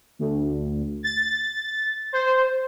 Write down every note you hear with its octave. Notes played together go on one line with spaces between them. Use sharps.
D2
A6
C5